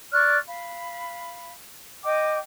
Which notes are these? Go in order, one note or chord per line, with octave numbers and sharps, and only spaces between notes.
D5 C#6 F6 F#6
F5 B5
D#5 G5 D6